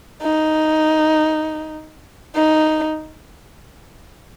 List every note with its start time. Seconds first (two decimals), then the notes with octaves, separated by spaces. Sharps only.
0.22 D#4
2.36 D#4